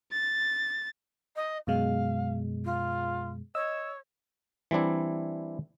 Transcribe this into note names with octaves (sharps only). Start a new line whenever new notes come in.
A6
D#5
F#2 B2 G#3 F5
F4
C#5 D#5 E6
E3 G3 C4 D4 E4